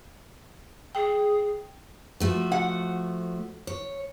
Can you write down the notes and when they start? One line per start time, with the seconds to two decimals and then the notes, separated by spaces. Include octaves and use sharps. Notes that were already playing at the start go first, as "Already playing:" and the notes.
0.95 G#4 G5
2.20 F3 A3 F#4
2.52 F#5
3.67 C#5